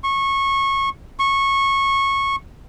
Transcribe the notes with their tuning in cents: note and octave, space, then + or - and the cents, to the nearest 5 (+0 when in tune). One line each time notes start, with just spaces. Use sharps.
C#6 -20
C#6 -15